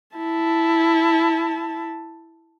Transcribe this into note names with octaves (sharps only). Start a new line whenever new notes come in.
E4 A5